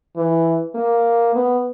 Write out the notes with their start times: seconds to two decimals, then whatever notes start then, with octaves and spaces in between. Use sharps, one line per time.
0.16 E3
0.75 A#3
1.35 B3